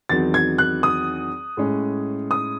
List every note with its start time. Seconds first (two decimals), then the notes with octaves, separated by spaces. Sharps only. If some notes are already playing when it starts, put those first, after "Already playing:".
0.09 E2 D#3 F#3 C4 A6
0.34 G#6
0.58 F#6
0.83 D#6
1.57 A2 G#3 C#4
2.31 D#6